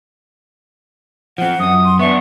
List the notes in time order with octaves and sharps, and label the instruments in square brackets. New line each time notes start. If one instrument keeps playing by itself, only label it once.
[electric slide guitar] F3 C4 [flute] F#5
[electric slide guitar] F#2 [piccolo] D#6
[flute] C6
[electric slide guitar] B3 D4 [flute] E5 [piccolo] C#6